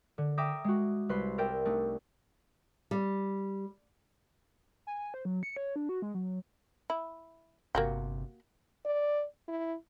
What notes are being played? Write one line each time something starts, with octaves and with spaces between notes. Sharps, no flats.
D3
E5 G5 A#5 D6 D#6 A#6
G#3 F#4
C2 B4 C6 B6
A#4 D5 E5 G5
A3 D4 D#4
G3
G#5
C5
F#3
C#7
C#5
D4
F#4
G#3
F#3
E4
G1 C3 A#3 F#4 G4
D5
E4